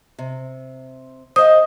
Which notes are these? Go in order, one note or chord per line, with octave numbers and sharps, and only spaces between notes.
C3
C5 D#5 F5 D#6